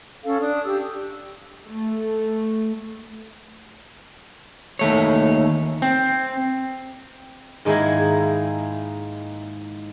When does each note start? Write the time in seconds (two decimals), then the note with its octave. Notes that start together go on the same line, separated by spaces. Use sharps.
0.24 C#4 A4 F5
0.40 D4 D#6
0.63 G4 E6
1.68 A3
4.79 D#2 A3 C#5
5.82 C4
7.65 G#2 D#3 G#3 A#3 E4